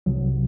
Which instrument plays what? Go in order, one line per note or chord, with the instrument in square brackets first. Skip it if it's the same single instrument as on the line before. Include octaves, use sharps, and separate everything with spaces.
[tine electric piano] C2 C3 F#3